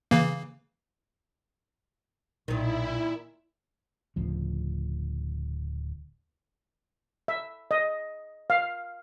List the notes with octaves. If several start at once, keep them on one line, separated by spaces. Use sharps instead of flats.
C#3 E3 A#3
B1 A#2 D#3 E4
D1 D2 C#3 F3
E5
D#5
F5